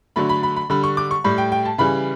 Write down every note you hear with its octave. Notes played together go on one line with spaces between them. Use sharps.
D3 F#3 A3 B5
B5
B5
B5
D3 G3 B5
C#6
D6
C#6
A2 G3 B5
G5
G5
A5
C#3 E3 G3 B5